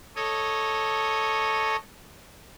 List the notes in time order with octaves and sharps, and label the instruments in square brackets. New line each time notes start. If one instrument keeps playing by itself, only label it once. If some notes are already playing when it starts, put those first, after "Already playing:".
[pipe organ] A4 C#5 D#5